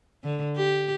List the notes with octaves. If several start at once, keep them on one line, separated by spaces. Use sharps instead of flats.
D3
G4